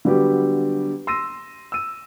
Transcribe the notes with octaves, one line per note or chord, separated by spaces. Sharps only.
D3 F#3 G3 B3 F#4 G4
C6 E6 A#6 D#7
E6 D#7